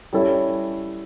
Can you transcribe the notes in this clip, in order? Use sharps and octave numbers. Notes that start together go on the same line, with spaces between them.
G3 C#4 E4 A4